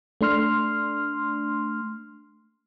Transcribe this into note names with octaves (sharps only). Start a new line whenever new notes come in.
A3 D4 C6 F6